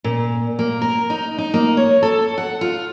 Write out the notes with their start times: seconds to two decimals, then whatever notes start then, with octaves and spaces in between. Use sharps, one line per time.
0.04 A#2
0.59 A#3
0.82 A#4
1.10 D#4
1.38 D#4
1.54 A#3
1.77 C#5
2.03 A4
2.38 F#5
2.61 F4